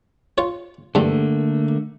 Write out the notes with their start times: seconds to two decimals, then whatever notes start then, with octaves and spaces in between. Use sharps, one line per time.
0.38 F4 C#5
0.95 E2 G2 D3 A3 A#3